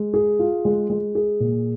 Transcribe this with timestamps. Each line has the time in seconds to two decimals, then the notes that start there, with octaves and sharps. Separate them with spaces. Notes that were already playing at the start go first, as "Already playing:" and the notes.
Already playing: G#3
0.14 G#4
0.39 F4
0.65 G#3
0.90 G#3
1.15 G#4
1.40 A#2